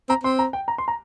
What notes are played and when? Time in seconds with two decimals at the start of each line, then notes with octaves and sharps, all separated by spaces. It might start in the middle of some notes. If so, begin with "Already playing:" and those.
0.09 C4 A#5
0.24 C4 C6
0.39 A#5
0.53 G5
0.68 A#5
0.78 C6
0.88 A#5